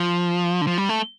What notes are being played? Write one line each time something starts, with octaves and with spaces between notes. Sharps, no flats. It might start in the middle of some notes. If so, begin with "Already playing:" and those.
Already playing: F3
D3
F3
G3
A3